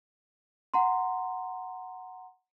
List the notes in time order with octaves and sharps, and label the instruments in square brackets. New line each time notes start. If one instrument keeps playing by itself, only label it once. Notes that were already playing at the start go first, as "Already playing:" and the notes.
[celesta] F#5 A#5 C6